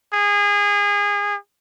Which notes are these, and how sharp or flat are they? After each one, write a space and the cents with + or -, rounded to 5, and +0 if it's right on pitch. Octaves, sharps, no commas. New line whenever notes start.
G#4 -25